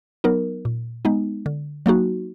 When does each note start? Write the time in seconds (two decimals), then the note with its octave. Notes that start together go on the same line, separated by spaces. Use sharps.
0.24 F#3 B3 D#4 A#4
0.65 A#2
1.05 G#3 B3 D#4
1.46 D3
1.86 F#3 A#3 D#4 F#4